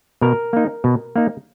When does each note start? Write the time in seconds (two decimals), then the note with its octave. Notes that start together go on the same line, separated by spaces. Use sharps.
0.21 B2 A#4
0.53 A#3 D#4
0.84 B2
1.16 A#3 D#4